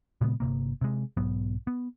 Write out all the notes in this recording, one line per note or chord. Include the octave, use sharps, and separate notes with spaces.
A#2 C#3 G#3 B3
G1 F2 C3 A#3
C3 G#3
B1 G#2 F#3 B3
B3